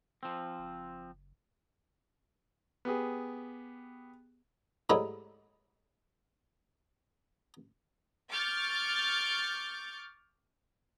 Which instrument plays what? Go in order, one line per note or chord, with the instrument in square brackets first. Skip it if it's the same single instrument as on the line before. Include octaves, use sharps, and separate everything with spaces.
[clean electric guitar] F3 C4
[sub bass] F#1
[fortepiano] B3 G4 G#4
[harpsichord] G#2 G3 A3 D#4 E4 C#5
[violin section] C#6 D6 F6 G6 A6